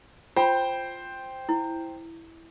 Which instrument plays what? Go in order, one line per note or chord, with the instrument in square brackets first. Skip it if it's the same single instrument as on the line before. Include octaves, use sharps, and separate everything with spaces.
[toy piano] F4 B5 [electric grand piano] C5 G5
[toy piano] E4